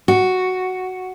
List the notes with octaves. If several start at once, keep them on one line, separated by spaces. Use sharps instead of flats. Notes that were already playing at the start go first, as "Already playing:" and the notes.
F#4